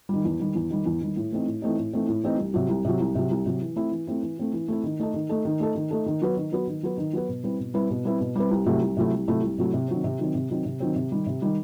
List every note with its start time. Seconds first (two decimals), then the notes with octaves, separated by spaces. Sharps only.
0.09 D#3 G3
0.24 E2
0.40 D#3 G3
0.55 E2
0.70 D#3 G3
0.86 E2
1.01 D#3 G3
1.16 A2
1.32 E3 A3 C4 D#4
1.46 A2
1.62 E3 A3 C4 D#4
1.77 A2
1.93 E3 A3 C4 D#4
2.08 A2
2.24 E3 A3 C4 D#4
2.38 C2
2.54 C3 F#3
2.69 C2
2.85 C3 F#3
3.00 C2
3.15 C3 F#3
3.31 C2
3.46 C3 F#3
3.61 E3
3.76 A3 C4 E4
3.91 E3
4.07 A3 C4 E4
4.23 E3
4.38 A3 C4 E4
4.53 E3
4.68 A3 C4 E4
4.84 D#3
5.00 A3 D#4 A4
5.14 D#3
5.29 A3 D#4 A4
5.45 D#3
5.60 A3 D#4 A4
5.75 D#3
5.91 A3 D#4 A4
6.06 D#3
6.22 F#3 B3 F#4 B4
6.37 D#3
6.52 F#3 B3 F#4 B4
6.67 D#3
6.83 F#3 B3 F#4 B4
6.98 D#3
7.13 F#3 B3 F#4 B4
7.29 B2
7.44 G3 C4 E4 B4
7.59 B2
7.74 G3 C4 E4 B4
7.90 B2
8.05 G3 C4 E4 B4
8.20 B2
8.36 G3 C4 E4 B4
8.51 C2
8.66 C3 F#3 A3 E4
8.82 C2
8.97 C3 F#3 A3 E4
9.12 C2
9.28 C3 F#3 A3 E4
9.43 C2
9.58 C3 F#3 A3 E4
9.74 C3
9.88 D#3 F#3 C4
10.04 C3
10.19 D#3 F#3 C4
10.35 C3
10.50 D#3 F#3 C4
10.65 C3
10.80 D#3 F#3 C4
10.96 C3
11.12 D#3 G3
11.27 C3
11.42 D#3 G3